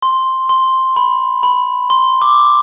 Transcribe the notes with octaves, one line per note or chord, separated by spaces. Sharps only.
C6
C6
B5
B5
C6
D6